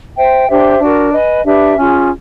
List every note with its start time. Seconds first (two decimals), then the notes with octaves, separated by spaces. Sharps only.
0.16 C5 E5 G5
0.48 D4 G4 C5 E5
0.81 D4 F#4 A#4
1.12 B4 D#5 G#5
1.44 D4 G4 B4 E5
1.77 C#4 F4 G#4